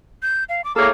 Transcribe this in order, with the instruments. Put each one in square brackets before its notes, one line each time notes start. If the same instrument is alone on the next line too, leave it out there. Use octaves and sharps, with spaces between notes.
[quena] G6
F5
D6
[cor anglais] A#3 [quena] G#4 [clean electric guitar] A4 C#5